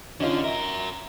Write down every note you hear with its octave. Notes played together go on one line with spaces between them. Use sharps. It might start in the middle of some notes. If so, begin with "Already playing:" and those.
D3 C#4 D#4 F4
F#4 A#4 E5